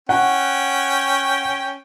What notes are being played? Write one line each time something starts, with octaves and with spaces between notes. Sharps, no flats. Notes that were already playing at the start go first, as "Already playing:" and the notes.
C#4 F#5 G5